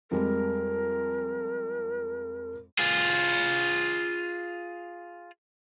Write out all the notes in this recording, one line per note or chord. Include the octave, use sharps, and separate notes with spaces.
F2 G3 G#3 A#4
F4 G#4